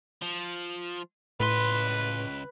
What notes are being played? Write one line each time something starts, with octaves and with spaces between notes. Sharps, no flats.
F3
C#2 A2 B4 C6